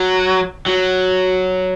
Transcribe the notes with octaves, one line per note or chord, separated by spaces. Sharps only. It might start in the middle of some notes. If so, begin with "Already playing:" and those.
Already playing: F#3
F#3